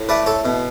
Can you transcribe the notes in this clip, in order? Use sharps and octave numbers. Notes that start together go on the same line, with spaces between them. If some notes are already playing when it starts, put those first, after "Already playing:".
Already playing: A2
A3 B4 D5
A4 C#5
B2